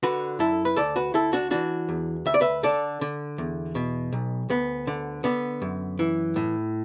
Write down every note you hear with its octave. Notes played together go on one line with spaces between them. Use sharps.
D3 F#4 B4
F#2 E4 A4
B4
D2 A4 D5
F#4 B4
D2 E4 A4
D4 F#4
E3 D4 F#4
E2
D2 E5
D5
B4 E5
D3 A4 D5
D3
E2
B2
B1
D2 B3
D3
D3 B3
F#2
E3
A2